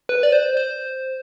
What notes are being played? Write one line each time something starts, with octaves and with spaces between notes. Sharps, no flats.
B4
D5
C5
C5